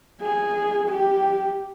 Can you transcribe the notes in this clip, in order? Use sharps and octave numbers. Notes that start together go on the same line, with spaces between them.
G#4
G4